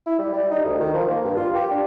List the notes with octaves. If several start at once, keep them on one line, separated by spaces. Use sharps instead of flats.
E4
G3
G3
D#4
D2
D#3
F3
A#3
G2
F4
G4
D4